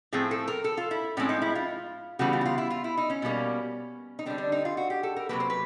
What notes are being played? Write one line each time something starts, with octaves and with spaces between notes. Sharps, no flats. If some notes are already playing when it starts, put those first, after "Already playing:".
A2 F3 A3 C4 G#4
A4
A#4
A4
F4
E4
A2 F3 G#3 C4 C#4
D#4
E4
F4
C#3 E3 G3 B3 F#4
F4
F#4
F4
E4
F4
E4
D#4
C#4
B2 G3 A#3
D#4
D3 G3 C4 D4
D4
D#4
F4
F#4
G4
A4
A#4
C3 D#3 F#3 A#3 B4
C5
B4